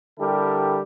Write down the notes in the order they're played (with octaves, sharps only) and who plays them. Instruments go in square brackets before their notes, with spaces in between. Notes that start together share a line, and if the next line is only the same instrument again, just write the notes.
[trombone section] D3 G3 E4 G4 A4 A#4